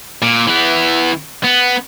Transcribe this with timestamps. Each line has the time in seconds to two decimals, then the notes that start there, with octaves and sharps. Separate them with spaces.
0.22 A#2
0.47 E3 B3
1.44 B3